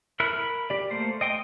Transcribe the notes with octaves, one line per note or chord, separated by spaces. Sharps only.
E4 A#4 B5 F#6
A#4 B5
G4 D5
A3 A#3 C5
D#5 G5 C6 D6 D#6